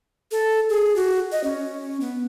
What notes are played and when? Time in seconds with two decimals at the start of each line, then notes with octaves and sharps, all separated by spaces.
0.32 A4
0.69 G#4
0.96 F#4
1.32 D#5
1.44 C#4
2.01 B3